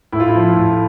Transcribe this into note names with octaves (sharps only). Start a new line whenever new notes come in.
A2 E4
F4
E4
F3
A2